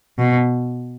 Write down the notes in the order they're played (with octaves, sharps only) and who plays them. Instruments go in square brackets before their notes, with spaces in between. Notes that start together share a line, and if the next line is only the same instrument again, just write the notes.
[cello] B2